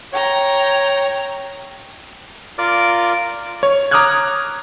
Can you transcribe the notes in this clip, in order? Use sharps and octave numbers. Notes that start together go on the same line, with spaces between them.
C#5 G5 A#5
F4 A#4 D5 D6
C#5
A#5 D6 D#6 F6 F#6 G#6